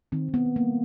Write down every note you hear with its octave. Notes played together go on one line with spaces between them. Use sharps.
D#3 C4
D#3
B3
A#3
A#3
G3